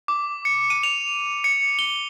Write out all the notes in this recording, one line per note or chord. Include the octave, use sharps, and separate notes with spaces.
D6
C#7
D#7
F7
C#7
G7